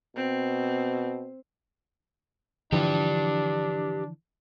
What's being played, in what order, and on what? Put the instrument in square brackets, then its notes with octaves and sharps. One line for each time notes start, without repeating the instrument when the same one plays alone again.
[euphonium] B2 [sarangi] C4
[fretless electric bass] D3 E3 F3 [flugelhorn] D4 [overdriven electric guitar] G4 B4